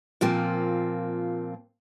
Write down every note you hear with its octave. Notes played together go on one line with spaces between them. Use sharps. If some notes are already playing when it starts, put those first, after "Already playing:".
A#2 F3 A#3 C4